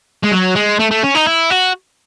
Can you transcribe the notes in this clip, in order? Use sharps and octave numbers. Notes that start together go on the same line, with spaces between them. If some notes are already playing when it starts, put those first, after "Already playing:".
G#3
F#3
G#3
A3
A3
C#4
D#4
E4
F#4